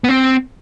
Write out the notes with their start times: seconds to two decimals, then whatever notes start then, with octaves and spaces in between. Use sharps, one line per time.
0.04 B3
0.09 C4